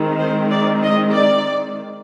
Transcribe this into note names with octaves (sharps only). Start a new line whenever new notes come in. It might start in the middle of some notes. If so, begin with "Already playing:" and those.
Already playing: D#3 G#3 C4
C5
D5
D#5
D5